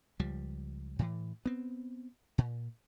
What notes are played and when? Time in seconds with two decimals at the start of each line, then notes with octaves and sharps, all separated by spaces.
0.20 C#2 F3 G3
0.99 A2 E3
1.46 B3 C4
2.38 A#2